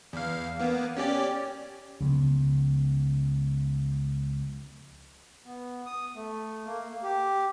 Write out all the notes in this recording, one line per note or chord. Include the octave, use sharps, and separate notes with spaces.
E2 F5
A#3 B3
C#4 G4 D5
C#2 C#3 F3 B3
B3
D#6
A3
A#3
G4